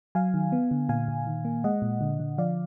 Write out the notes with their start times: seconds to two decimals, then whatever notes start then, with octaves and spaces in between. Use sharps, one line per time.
0.15 F#3 F5 G#5
0.34 D#3
0.52 B3
0.71 D3
0.89 A#2 F5 G#5
1.08 A#2
1.27 D#3
1.45 A#3
1.64 G#3 D#5 F#5
1.82 A#2
2.01 D3
2.20 D3
2.38 F3 D5 F5